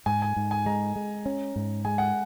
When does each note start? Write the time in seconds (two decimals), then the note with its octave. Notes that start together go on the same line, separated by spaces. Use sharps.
0.06 G#2 G#5
0.22 G#5
0.37 G#2
0.51 G#5
0.66 G#3 A#5
0.96 G#3
1.26 C#4
1.56 G#2
1.85 G#3 G#5
1.98 F#5